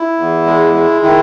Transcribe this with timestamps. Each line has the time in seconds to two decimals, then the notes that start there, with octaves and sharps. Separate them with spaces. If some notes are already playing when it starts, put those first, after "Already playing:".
Already playing: E4
0.18 E2
0.46 G#3
0.74 G#3
1.02 D#3 E4